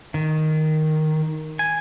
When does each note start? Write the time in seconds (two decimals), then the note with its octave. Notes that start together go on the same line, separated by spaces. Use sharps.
0.14 D#3
1.59 G#5